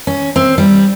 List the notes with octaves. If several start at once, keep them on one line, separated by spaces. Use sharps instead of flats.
C#4
C4
G3